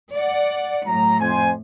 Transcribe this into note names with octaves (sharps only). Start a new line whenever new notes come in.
D5 F#5
A2 F#3 A#5
F2 C5 G#5